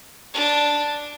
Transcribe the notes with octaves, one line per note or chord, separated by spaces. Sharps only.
D4